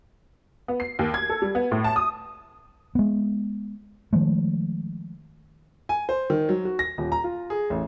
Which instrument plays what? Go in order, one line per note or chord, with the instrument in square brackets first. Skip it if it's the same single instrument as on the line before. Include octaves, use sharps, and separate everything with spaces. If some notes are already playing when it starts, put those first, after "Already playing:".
[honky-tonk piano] B3
C7
D#2
G#6
A4
G3
B3
A2
A5
D#6
[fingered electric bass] G#3 B3
D#3 F3 G#3 A3
[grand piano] G#5
C5
D#3
F#3
F#4
A#6
D#1
A#5
F4
G#4
A1